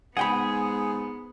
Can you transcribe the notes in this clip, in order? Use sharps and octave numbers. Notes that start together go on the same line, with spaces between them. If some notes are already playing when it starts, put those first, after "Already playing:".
G#2 B3 G#4 F#5 G5 B5